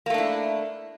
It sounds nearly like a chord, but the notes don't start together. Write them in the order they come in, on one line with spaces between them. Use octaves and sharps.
A#3 A3 D4 E4